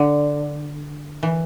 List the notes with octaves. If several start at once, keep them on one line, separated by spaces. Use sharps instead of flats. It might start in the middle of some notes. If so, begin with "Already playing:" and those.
Already playing: D3
E3